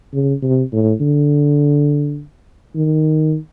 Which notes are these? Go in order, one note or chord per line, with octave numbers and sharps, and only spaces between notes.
C#3
C3
A2
D3
D#3